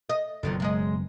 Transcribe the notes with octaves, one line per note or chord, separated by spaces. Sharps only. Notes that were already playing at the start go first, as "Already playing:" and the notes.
D#5
F#1 B2 D3 D#3 F3
F#2 G#3 D#5